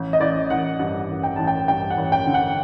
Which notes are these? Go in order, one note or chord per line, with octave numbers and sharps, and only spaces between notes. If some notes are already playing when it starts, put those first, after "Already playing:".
Already playing: A1
D#5
A1 D5
A1 F#5
G2 F#5
A1
G5
A1 A5
G5
G2 G5
F#5
A1
G5
D3
F#5